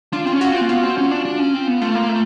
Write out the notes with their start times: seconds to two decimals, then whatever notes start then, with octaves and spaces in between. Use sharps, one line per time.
0.13 D4 F4
0.25 C4 F4
0.32 C#4
0.41 F#4
0.50 C4 F4
0.61 A#3
0.69 B3 F4
0.83 C4
0.98 C#4
1.11 D4
1.25 D4
1.39 C#4
1.54 C4
1.67 B3
1.81 A3 F4
1.95 A#3
2.09 A3